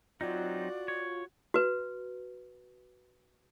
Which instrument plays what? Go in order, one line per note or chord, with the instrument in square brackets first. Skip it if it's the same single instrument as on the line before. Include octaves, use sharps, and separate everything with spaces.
[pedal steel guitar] F#3 C4 D#4 [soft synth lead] F4 [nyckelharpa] F#4 [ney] D5
[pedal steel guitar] C#5
[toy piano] F#4 B4